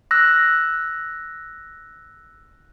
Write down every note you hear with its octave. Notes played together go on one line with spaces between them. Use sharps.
E6 F#6 A#6